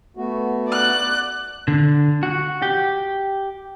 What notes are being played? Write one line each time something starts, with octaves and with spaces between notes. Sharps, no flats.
A3 B3 F#4
D5 F#6
D3
F#4
G4